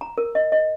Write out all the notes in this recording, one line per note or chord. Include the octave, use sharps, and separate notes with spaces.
A#5
A#4
D#5
D#5